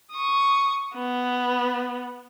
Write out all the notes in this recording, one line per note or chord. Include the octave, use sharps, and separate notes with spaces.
C#6 D#6
B3